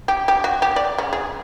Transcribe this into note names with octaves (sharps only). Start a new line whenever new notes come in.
G4
G4
F#4
G4
D5
C#3
G#4